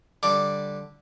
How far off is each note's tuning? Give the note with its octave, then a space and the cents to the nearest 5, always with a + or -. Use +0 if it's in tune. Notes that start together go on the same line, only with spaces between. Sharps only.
D3 +0 G3 +0 D6 +0